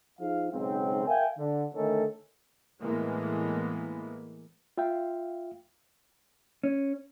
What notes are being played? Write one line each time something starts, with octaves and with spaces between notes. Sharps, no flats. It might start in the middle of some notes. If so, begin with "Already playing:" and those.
F3 D#4 G#4 F5
B1 G#2 C#3 C4
A#4 E5 F5 G5 G#5
D3
D3 D#3 A3 C#4 D#4 A4
A2 E3 G#3 A#3 B3
F4 E5 F5 G5
C#4